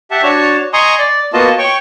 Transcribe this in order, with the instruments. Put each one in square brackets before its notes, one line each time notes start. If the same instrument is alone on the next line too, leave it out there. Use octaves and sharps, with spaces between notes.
[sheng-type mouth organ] G4 E5 F#5 A5
D4 F#4 C#5 A5
D#5 G#5 A#5 C6 C#6 D#6
D5
A#3 B3 F4 F#4 D#5 A5
C#5 G5 C#6